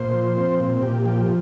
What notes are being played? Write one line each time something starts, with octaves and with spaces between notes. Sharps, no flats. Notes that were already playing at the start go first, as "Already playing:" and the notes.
Already playing: A#2 C5
F3
C4
A#2
A#2 G4
F3 G4